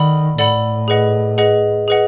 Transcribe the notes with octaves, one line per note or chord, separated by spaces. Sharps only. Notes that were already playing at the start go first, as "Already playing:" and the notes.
Already playing: D#3 A4 D5 F#5 B5
A2 A4 D5 F#5 B5
G#4 B4 D#5 F#5
G#4 B4 D#5 F#5
G#4 B4 D#5 F#5